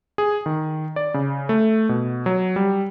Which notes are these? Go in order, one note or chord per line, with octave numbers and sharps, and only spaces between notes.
G#4
D#3
D5
C#3
A3
B2
F#3
G3